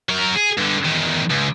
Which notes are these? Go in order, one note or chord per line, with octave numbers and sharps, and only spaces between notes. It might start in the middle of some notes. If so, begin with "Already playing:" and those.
F#3 A#4
G#4
G2 D3
E2 D#3
C#2